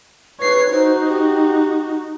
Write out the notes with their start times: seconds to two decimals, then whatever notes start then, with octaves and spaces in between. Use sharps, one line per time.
0.40 B4 C#5 C7
0.71 D#4 F#4 C5
1.08 G4